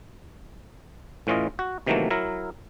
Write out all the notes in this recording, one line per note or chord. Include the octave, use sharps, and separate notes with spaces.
A2 E3 C#4 F4 D#5
F#4
C3 D#3 E3 F#3 A3 A#3
F#3 E4 A#4